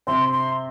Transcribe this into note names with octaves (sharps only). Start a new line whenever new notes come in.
C3 C4 C6
C6